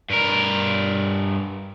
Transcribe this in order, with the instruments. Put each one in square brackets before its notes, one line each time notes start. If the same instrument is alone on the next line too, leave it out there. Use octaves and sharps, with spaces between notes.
[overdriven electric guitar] G2 A#4